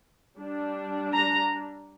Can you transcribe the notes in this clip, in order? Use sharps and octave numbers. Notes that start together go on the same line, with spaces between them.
G3 D4
A#5